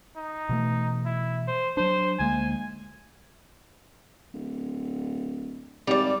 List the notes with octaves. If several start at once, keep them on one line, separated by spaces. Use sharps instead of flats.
D#4
B2 E3 A3
E4
C5
F#3 D4 C5
D2 G#3 A#3 G#5
D1
G#1 G3 D5